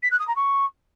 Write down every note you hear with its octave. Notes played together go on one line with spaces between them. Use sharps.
B6
F#6
D#6
A#5
C#6